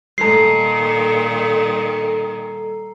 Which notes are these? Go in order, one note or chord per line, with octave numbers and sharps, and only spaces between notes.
A#2 D#3 G3 A4 A#5 C7